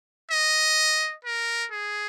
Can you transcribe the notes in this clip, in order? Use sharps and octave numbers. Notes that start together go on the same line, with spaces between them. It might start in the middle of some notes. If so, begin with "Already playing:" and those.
D#5
A#4
G#4